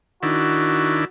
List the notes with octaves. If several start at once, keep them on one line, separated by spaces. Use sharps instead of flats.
D#3 D4 E4 F#4